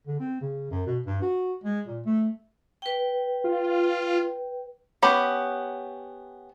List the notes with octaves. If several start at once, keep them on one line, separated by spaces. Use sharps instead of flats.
D3
C4
C#3
F#2
B2
G2
F#4
G#3
A#2
A3
B4 G5
F4
B3 C#4 G4 B5